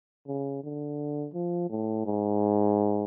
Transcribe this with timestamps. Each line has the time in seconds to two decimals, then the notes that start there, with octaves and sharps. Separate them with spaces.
0.27 C#3
0.64 D3
1.34 F3
1.70 A2
2.06 G#2